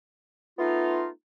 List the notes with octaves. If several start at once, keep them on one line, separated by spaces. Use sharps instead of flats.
A3 B3 D#4 F4